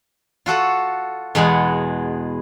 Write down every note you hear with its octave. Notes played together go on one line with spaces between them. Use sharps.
F4 F#4 A4 F#5
E2 B2 G#3 F#5